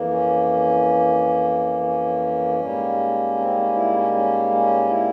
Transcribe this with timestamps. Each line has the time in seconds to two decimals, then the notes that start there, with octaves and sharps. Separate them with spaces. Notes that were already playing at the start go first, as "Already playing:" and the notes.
Already playing: F2 E3 A#3
0.10 C#4
1.83 C#4
2.59 G#2 G3 A#3
3.36 C4
3.55 C#4
3.74 E4
3.94 C#4
4.13 C#4
4.51 C#4
4.89 E4